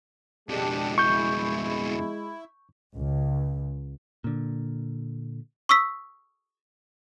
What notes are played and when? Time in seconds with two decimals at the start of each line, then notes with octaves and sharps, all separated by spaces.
0.49 F2 B2 G#3 D4 G4
0.98 E4 C#6 G6
2.95 C#2
4.24 A#2 D3
5.69 C#6 D#6 E6 B6